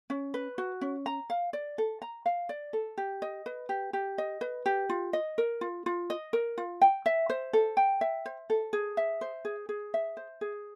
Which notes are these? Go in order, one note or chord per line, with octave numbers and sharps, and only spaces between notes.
C#4
B4
F#4
C#4
A#5
F5
D5
A4
A#5
F5
D5
A4
G4
D#5
B4
G4
G4
D#5
B4
G4
F4
D#5
A#4
F4
F4
D#5
A#4
F4
G5
E5
C5
A4
G5
E5
C5
A4
G#4
E5
C5
G#4
G#4
E5
C5
G#4